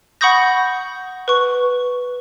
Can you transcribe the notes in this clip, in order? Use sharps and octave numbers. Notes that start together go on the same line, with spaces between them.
F#5 B5 C#6 D#6 G6 A#6
B4 C#6